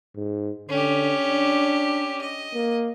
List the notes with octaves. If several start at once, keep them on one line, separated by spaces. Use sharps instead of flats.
G#2
D3 C#4 G4
D4
D#5
A#3